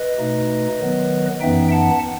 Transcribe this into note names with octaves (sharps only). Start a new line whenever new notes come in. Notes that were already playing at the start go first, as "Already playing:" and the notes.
Already playing: B4 D#5
B2 A3 D#4
D#3 F#3 B3
F#2 E3 B3 D#4 E5 G5
F#5 A5